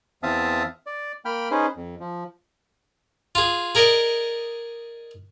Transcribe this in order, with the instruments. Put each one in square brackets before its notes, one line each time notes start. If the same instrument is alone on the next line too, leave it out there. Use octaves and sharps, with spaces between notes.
[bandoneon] E2 C4 E5 F5 A5 D#6
D5
A#3 G5 B5 F6
C#4 D#4 G#4 B4 C5
F2
F3
[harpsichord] F4 G#4
G#4 A#4 D5 D#5